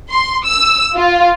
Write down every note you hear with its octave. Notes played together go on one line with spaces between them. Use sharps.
C6
E6
F4